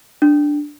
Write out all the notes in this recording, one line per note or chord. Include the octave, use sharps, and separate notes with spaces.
D4